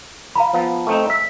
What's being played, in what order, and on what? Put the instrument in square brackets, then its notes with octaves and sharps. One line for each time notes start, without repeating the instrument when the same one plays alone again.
[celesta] F5 A#5 B5
[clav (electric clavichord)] F3 B3
A3 C4 D#4
[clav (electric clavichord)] E5 [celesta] B6